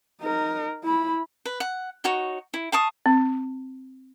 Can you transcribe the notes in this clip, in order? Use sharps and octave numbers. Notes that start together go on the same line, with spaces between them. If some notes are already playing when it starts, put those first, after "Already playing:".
D#4 A#4
E4 B5
B4
F#5
D#4 F#4 C#5
E4
F5 A5 C#6 D#6
C4